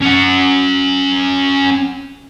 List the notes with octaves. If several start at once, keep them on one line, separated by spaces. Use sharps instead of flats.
C#4 F#5